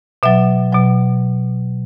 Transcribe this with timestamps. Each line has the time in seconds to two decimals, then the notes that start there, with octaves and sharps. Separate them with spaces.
0.23 B2 F#3 E5
0.73 B2 F#3